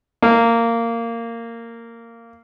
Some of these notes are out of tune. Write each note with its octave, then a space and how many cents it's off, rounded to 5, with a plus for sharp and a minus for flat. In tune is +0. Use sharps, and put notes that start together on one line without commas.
A#3 -15